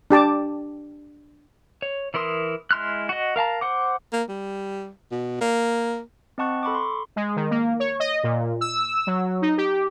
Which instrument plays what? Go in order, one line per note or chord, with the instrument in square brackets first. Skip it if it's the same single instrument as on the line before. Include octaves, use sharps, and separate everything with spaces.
[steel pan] D4 G4 A5 D6
[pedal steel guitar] C#5
E3 E4 A#4 C6 D#6
G#3 E4 C6 F6 F#6
F#4 D#5
A#4 F5 A5 A#5
C5 F#5 D6
[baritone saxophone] A#3
G3
B2
A#3
[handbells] C4 D#5 F#5 A5 C#6 F#6
A4 B5 C#6 D6
C6
[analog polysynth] G#3
D#3
A#3
C#5
D#5
A#2
E6
F#3
D#4
G4